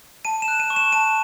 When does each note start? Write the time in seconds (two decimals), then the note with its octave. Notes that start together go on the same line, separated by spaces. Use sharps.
0.25 A5 D#7
0.42 E7
0.48 F#6
0.60 D#7
0.70 C#6
0.76 E7
0.92 A5 D#7